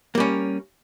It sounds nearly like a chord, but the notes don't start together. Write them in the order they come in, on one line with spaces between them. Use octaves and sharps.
A#3 G3 C#4